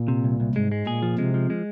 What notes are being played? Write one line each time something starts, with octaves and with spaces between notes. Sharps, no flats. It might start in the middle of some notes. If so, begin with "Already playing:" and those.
Already playing: A#2
C3
C2
C2
G#2 G#3
G#3
A#2 G#4
F3
C3 G#3
F3
G#3